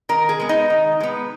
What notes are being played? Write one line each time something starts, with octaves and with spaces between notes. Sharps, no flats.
D#3 A#4
G#4
G#3 B3
D#4
D#3
G#3 B3